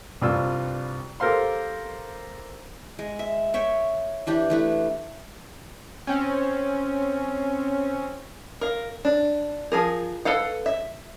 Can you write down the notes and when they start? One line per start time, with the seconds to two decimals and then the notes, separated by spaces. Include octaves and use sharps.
0.22 C2 G2 F4 E6
1.20 G4 A4 A#4 C5 F5 C6
2.99 G#3
3.19 E5
3.54 C#5 E5 G5
4.27 E3 D4 G4
4.50 E3 A3 B4
6.07 C4 C#4
8.61 A#4 F5
9.05 D4
9.72 F3 G#4 A#4
10.25 A4 B4 F5 F#5
10.66 E5